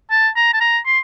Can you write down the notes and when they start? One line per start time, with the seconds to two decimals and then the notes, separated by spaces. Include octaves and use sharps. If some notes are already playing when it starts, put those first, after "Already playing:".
0.11 A5
0.36 A#5
0.54 A5
0.60 A#5
0.86 C6